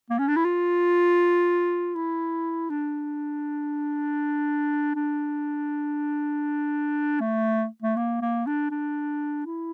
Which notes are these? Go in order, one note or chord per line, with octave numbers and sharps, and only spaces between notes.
A#3
C#4
D4
E4
F4
E4
D4
D4
A3
A3
A#3
A#3
D4
D4
E4